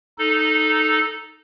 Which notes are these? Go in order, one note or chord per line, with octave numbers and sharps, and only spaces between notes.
D#4 A4